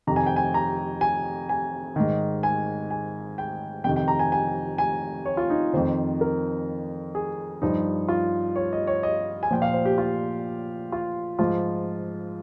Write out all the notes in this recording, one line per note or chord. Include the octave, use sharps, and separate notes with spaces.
F2 C3 D#3 A#5
G#5
G5
G#5
A#5
G#5
G#5
G#2 D#3
G#5
G#5
G5
F2 C3 D#3 G5
G5
A#5
G#5
G#5
G#5
C#5
F4
D#4
F2 D#3 C5
A#4
G#4
G2 F3 D#4
F4
C#5
D#5
C#5
D#5
G#5
A#2 F3 G5
F5
C5
G4
F4
F4
G#2 F3 F4